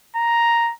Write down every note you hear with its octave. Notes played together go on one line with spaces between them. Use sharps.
A#5